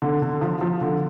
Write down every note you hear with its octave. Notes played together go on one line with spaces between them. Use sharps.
D3
D3
F3
F3
D3